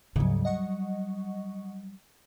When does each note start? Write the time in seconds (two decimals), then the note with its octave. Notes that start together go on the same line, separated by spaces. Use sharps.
0.16 D2 G#2 C#3 F#3 G3
0.45 D#5 F#5 C#6